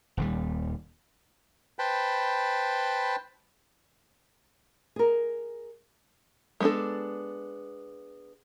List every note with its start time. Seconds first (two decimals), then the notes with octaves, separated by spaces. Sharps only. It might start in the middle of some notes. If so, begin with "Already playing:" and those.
0.17 D#1 D#2 G3
1.79 B4 C5 G5 A5 B5
4.96 G#4 A#4
6.60 G#3 B3 C#4 D4 A4